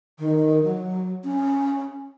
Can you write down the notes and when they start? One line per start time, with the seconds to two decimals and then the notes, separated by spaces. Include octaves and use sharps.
0.19 D#3
0.63 F#3
1.24 C#4